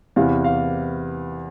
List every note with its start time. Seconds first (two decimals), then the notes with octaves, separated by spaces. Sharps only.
0.16 E2 C3 E3 F5
0.44 F5